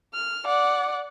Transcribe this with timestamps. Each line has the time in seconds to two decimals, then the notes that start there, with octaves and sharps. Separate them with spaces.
0.14 F6
0.46 D5 F#5